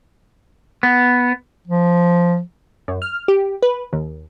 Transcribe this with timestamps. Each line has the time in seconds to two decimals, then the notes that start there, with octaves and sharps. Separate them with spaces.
0.83 B3
1.67 F3
2.88 F#2
3.02 F6
3.28 G4
3.62 B4
3.93 D#2